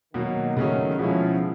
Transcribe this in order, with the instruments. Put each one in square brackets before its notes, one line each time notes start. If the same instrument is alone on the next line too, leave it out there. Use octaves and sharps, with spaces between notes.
[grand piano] B2 F#3 A#3 [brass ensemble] D#3
[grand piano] C#3 F#3 A3 C#4
[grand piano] B2 G#3 C#4 E4 [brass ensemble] F3